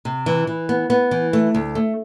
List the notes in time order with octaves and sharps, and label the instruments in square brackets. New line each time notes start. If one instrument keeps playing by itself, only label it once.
[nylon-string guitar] C3
E3
E3
B3
B3
E3
A3
D2
A3